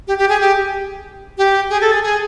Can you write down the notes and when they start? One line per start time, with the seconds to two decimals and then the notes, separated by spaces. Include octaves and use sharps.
0.08 G4
0.18 G4
0.29 G#4
0.41 G4
1.38 G4
1.70 G#4
1.81 A4
1.92 G#4
2.03 G#4